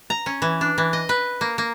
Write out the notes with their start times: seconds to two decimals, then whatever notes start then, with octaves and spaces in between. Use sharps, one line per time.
0.10 A#5
0.26 C#4
0.42 E3
0.61 D4
0.78 E3
0.93 D#5
1.09 B4
1.41 A#3
1.58 A#3